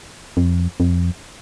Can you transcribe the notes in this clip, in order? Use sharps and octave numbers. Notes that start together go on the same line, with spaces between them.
F2
F2